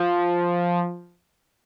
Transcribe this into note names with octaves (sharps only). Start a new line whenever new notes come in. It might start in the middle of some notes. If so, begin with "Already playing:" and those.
Already playing: F3